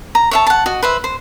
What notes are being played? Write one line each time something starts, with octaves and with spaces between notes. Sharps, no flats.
A#5
C#5 E5 A5
F#5 A5
F#4 D#5
B4 C5 E5
C5